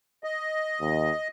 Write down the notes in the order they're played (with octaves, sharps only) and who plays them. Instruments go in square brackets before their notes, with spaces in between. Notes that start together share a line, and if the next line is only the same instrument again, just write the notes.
[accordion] D#5
[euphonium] D#2